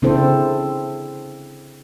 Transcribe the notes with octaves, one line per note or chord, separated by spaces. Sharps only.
C#3 C4 D4 E4 A4 C5